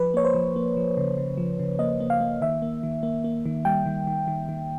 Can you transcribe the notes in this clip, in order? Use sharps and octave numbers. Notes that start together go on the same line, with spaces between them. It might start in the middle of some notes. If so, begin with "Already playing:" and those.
Already playing: F3 B4
A#3 C#5
C5
F3
A#3
F3
C#3
C#3
F3
C#3
A#3 D#5
A#3
F5
A#3
D#3 E5
A#3
D#3
A#3
A#3
D#3
G3 G5
D#3
D#3
D#3
D#3